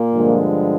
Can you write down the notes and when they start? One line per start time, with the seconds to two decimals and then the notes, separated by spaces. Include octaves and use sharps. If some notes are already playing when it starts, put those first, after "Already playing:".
Already playing: A#2 A#3
0.14 G2 D3 F3 G#3